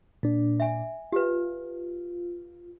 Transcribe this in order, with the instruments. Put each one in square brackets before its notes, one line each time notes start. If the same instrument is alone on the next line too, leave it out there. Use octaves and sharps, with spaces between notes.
[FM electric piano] A#2 D4
[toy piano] E5 G#5
[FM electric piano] F4 [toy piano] G4 B4